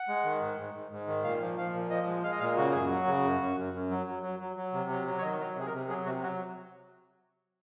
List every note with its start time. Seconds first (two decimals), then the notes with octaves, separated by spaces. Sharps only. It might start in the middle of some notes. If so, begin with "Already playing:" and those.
Already playing: F#5
0.08 G#3
0.24 D#3
0.41 G#2
0.58 G#2
0.74 G#2
0.91 G#2
1.07 D#3
1.24 A#2 F5
1.41 F3
1.58 F3 F5
1.74 A#2
1.90 F3 D#5
2.07 G#3
2.23 G#3 F5
2.32 D#5
2.40 A#2 F5
2.57 C#3 F#4
2.71 F#2 G#4
2.85 F#4
2.90 F#3
3.07 C#3
3.24 F#2
3.41 F#2
3.57 F#2
3.74 F#2
3.91 F#3
4.06 F#3
4.23 F#3
4.39 F#3
4.56 F#3
4.73 C3
4.90 F#3
5.06 F#3
5.18 C#5
5.22 D#3 D#5
5.39 F#3
5.56 C3 G#4
5.66 A#4
5.73 C3
5.89 F#3 G#4
6.05 C3 F#4
6.22 F#3 F#4